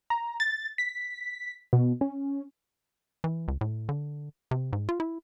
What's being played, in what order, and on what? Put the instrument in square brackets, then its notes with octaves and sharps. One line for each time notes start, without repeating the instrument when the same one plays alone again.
[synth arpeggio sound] A#5
A6
B6
B2
C#4
[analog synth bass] E3
C#2
A2
D3
C3
G#2
F4
E4